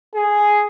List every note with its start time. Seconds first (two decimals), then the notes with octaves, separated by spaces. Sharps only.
0.15 G#4